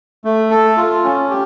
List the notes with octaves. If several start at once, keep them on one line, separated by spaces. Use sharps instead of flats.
A3
A4
F4
C#4
G4